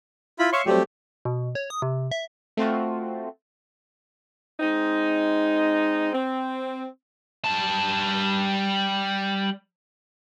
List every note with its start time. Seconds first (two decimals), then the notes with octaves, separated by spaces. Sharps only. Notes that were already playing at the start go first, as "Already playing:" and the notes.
0.39 E4 F4 B5
0.53 C#5 E5 F5 C6 C#6 E6
0.66 F#3 G3 A3 C4 G4
1.25 B2
1.55 C#5
1.70 D#6
1.82 C3
2.11 E5
2.57 A3 C4 F4 F#4
4.60 G#3 C4 D#4
6.13 C4
7.44 G3 A5